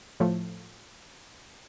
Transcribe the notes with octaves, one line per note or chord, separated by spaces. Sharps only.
A2 F3 A3